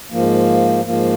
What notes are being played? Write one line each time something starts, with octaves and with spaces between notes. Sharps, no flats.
G#2 F3 A#3
G#2 F3 A#3